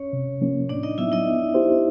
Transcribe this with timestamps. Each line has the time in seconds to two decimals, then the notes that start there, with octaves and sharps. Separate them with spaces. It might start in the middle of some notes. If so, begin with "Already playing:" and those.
Already playing: C#4 C#5
0.13 C3
0.41 F3 A#3 C#4
0.69 A2 D4 D5
0.83 D#4 D#5
0.98 F#3 B3 E4 E5
1.12 D#4 D#5
1.26 B3
1.55 E4 G4 C5